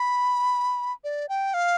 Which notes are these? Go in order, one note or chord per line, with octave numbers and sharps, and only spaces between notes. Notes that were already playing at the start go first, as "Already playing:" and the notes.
Already playing: B5
D5
G5
F5